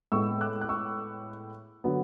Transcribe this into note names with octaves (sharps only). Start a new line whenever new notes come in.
A2 G#3 B3 C#6 E6
D6 F#6
F#6
C#6 E6
D3 F#3 B3